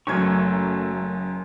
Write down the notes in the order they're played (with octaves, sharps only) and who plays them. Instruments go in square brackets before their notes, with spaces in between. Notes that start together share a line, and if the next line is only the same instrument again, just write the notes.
[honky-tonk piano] F#1 F#2 G#6 [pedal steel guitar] F#3 A3 C#6